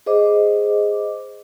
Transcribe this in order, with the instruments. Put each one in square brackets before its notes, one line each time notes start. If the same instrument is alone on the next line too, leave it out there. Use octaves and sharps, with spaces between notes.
[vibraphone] G#4 C5 D#5 D6